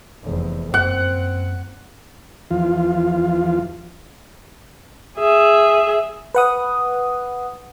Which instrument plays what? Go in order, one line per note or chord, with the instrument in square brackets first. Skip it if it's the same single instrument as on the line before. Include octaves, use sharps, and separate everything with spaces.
[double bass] F1 E2
[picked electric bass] F#2 A#3 [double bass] C4 [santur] F#5
[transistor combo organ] E2 F3 F4
[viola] G#4 E5
[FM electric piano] B4 F#5 D#6